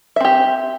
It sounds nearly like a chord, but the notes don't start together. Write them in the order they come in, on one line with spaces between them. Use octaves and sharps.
E5 C4 G4